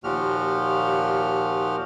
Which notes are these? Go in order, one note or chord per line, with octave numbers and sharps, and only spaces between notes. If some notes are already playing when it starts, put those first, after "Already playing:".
D#2 A#2 F3 F#4 G4 F6